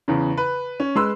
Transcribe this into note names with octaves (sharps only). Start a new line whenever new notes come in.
E2 C#3
B4
C#4
G#3 B4 C6 E6